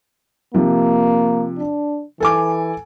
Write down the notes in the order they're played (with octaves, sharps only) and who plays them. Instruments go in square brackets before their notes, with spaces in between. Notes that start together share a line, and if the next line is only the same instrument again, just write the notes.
[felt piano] C3 F3 [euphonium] A#3
[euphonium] D4
[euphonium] E3 [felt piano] A4 G#5 D6